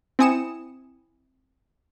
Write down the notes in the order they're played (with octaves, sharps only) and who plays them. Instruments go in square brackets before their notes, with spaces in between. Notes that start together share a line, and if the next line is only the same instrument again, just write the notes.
[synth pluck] C4 E4 G#5 D#6 C#7 E7